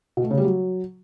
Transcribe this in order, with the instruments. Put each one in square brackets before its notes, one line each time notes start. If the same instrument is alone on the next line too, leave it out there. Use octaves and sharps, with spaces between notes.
[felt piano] B2
A3
C#3
G3
F#3